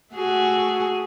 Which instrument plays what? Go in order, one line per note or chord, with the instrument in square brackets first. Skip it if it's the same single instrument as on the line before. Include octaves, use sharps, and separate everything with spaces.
[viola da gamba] A3 F#4 G#4